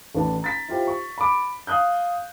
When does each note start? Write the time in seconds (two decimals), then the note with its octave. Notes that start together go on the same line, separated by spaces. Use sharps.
0.15 A1 D4 B4 A5
0.42 A#5 A6 B6
0.69 E4 F4 G4 C5
0.87 C#6
1.18 B5 D6
1.67 F5 D#6 F#6 G6